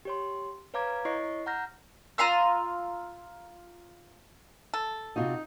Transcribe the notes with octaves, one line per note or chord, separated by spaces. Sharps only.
G4 C#5 C6
B4 C#5 F5 A#5 D6 G#6
E4 C#5 D#5 C#6 C7
F#5 A#5 F6 G6 A#6
F4 A#5 C6 E6
A4
C3 D#4 F4 F#4